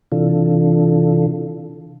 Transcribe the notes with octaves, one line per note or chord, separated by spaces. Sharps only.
C3 E3 D4 F4 A4